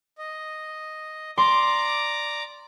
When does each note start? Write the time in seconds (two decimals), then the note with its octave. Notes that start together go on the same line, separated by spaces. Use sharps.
0.18 D#5
1.38 D5 A#5 C6 D6